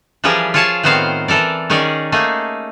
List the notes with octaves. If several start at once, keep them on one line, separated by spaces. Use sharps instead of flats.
E3 F3 G3 G4 G#4 A#4
F4 G#4 C#5 F5 A5
A2 D#3 B3 C4 C5 F5
E3 A4 A#4 D5
D#3 C#4 D#4 G#4 D5
A3 A#3 D#4 G#4